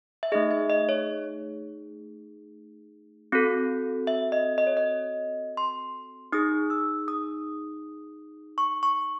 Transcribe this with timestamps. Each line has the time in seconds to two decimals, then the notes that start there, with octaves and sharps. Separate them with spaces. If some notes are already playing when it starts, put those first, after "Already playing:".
0.23 E5
0.32 A3 D#4 G#4 D#5
0.51 E5
0.70 D#5
0.89 C#5
3.32 C4 F#4 A4
4.07 E5
4.32 D#5
4.58 D#5
4.67 C#5
4.77 D#5
5.57 C6
6.32 D#4 G#4 D#6
6.70 E6
7.08 D#6
8.58 C#6
8.83 C#6